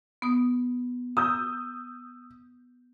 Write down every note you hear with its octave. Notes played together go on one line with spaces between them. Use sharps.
B3 D#6
A#5 D#6 E6 G6